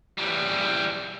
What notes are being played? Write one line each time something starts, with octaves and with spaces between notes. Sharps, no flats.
E3 G3